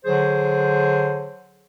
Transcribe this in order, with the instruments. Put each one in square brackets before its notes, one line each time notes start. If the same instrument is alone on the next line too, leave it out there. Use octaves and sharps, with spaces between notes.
[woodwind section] D3 F#3 G#4 C5